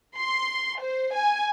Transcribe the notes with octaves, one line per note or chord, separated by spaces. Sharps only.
C6
C5
G#5